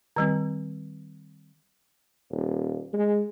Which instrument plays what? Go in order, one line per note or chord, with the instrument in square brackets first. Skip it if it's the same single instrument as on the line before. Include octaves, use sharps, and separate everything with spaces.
[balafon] D#3 G3 C4
[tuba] D#1
G#3